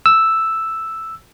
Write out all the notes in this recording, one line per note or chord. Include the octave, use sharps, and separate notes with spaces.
E6